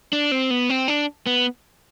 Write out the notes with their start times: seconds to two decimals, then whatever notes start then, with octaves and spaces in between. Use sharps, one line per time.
0.13 D4
0.32 C4
0.51 B3
0.69 C4
0.88 D4
1.26 B3